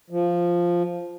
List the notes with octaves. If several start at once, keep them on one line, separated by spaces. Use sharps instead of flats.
F3